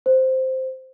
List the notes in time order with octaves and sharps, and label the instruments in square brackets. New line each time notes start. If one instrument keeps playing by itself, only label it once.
[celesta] C5